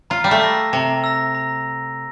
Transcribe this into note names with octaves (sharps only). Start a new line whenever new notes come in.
F4 A#5
G3
A3
E6 A#6
C3 A#5
E6 A#6
A#5